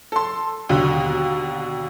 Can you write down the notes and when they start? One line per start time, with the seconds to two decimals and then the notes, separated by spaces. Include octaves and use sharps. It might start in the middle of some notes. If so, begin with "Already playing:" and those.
0.12 A4 C6
0.69 D#2 B2 D3